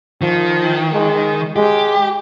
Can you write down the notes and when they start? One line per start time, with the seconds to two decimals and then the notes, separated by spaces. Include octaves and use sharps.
0.21 D#3 F3
0.93 G#3
1.56 G#3 G4